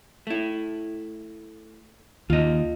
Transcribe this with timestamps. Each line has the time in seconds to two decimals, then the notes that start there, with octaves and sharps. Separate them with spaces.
0.27 A3 E4
2.30 D#2 F4 D#5